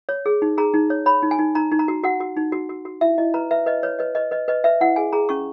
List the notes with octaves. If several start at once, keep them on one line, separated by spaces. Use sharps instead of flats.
C#5
G#4
D#4
G#4 A#5
D#4
C#5
C#5 B5
D#4
G#5
D#4
D#4 A#5
D#4
A#5
F#4
F#4 F#5
F#4
D#4
F#4
F#4
F#4
E4 E5
E4 D#5
B4 A#5
B4 E5
B4 D#5
B4 C#5
B4 D#5
B4 D#5
B4 D#5
B4 D#5
B4 E5
E4 F#5
G#4 G#5
G#4 A#5
C#4 C#6